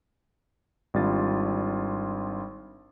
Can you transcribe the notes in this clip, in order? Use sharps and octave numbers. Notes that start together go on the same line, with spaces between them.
G#1 G3 D4 F4 A6